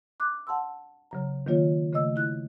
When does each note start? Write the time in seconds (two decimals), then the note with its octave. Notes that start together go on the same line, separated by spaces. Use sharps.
0.20 D6 F#6
0.47 F#5 A5 C6 E6
1.11 C#3 F#3 A#5
1.46 D#3 F#3 A#3 F4 C#5
1.93 C#3 A3 D#5 E6
2.16 E4 F#6